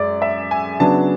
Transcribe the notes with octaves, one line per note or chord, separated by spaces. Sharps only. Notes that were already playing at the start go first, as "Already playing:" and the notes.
Already playing: F#2 G#3 D5
E5
G#5
C#3 F#3 B3 D4 A5